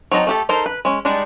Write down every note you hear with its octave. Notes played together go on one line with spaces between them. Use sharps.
F#3 C4 D#4 D#5 A5
A3 G4 A4
D#4 A4 A#4 C5
B4
G#3 C#4
G3 G#3 D4 D#4